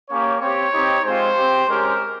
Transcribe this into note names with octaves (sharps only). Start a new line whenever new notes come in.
A#3 C#4 G4 C#5
C4 G4 C#5
C4 D#4 G4
G#3 C4 F4 C5
C4 G4
G#3 C#4 G4 A#4